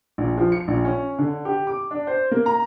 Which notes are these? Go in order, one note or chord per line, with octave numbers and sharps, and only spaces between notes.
A#1
F3
C#7
A#1
C#4
D3
G4
D6
D4
C5
A#3
A#5